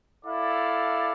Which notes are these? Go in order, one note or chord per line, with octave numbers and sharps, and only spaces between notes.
E4 A4 D5 F5